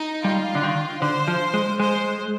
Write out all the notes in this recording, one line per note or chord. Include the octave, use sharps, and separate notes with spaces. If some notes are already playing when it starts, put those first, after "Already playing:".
Already playing: D#4
G3 F4
D3
D#3
D3 C5
F3
G#3
G#3 C5